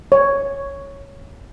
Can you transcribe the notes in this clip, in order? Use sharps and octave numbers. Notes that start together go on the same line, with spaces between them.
C#5